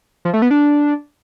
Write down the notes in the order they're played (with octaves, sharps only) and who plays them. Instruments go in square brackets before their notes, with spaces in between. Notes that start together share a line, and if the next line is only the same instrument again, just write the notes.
[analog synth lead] F3
A3
B3
D4